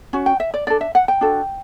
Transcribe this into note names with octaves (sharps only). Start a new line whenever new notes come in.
C#4 F#4
G5
E5
D5
D4 A4 D5
E5
F#5
G5
D4 F#4 A4